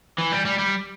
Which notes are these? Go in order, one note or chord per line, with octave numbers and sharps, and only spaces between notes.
E3
G3
G3
G3